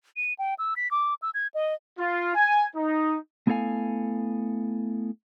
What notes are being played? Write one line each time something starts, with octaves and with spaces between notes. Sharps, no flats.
D#7
G5
E6
B6
D6
E6
G#6
D#5
F4
G#5
D#4
A3 B3 E4 A4 F5 G#5